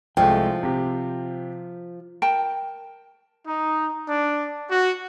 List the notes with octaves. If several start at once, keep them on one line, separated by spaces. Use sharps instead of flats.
C2 F3 G#3 A3 G5
C3 G4
A#4 G5 A5
D#4
D4
F#4